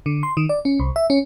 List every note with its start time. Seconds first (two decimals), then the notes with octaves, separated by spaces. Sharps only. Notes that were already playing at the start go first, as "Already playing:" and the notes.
0.06 D3
0.23 C6
0.37 D#3
0.49 D5
0.65 C#4
0.80 C2
0.96 E5
1.10 C#4